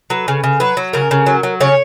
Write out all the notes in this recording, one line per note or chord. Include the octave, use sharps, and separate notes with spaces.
F#3 B4
C#3
C#3
F#3 B4
F#3
C#3 A#4
C#3
F#3
F#3
C#3 C#5